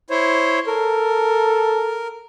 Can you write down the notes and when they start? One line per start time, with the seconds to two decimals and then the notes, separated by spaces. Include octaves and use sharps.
0.10 E4 C5 C#5
0.67 A4 A#4